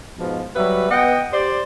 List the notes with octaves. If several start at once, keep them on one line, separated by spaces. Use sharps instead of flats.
G#2 B2 F3
F#3 G3 B4 E5
B3 D#5 F#5 G5
G4 C5 D5